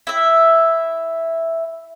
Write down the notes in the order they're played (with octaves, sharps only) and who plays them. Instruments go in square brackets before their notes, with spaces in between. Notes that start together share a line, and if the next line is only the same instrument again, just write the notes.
[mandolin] E4 E5